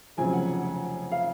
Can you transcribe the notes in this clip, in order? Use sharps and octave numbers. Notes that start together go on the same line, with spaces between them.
F1 F2 C#3 F#3 G#5
F#5
F5